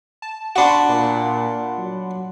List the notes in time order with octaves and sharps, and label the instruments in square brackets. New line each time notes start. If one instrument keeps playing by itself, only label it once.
[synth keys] A5
[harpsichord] D4 F#4 [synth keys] F#5 B5 C6
[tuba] A#2
F#3